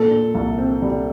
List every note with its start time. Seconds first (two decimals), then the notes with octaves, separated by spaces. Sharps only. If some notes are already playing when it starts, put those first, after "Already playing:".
Already playing: A#2 A4
0.11 A#2
0.35 C2
0.58 C4
0.82 G3